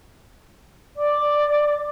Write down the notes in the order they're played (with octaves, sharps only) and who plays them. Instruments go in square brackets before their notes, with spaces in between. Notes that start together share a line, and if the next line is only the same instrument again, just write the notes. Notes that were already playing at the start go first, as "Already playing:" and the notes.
[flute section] D5 D6